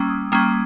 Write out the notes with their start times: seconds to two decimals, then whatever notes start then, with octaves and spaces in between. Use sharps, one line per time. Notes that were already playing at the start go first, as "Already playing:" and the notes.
Already playing: G3 A#3 C#4 E6
0.10 D#6
0.32 G3 A#3 C#4 D#6